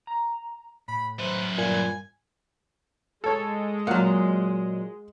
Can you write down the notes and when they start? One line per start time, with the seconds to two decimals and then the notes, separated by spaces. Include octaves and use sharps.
0.07 A#5
0.88 A2 B5
1.19 F#2 B4 C5
1.58 G2 A#2 G#5
3.24 G#3 A4 C#5
3.87 A#2 F#3 F5 F#5